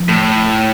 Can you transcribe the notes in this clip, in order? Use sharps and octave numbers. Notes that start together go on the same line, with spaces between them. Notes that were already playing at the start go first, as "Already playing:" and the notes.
Already playing: F3
A2